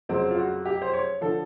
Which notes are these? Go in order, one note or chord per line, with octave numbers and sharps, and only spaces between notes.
F2 C#3 F#3 C4
F4
F#4
G4
C5
C#5
D3 F3 A4